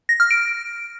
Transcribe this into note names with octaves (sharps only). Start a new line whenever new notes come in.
A#6
F6
D7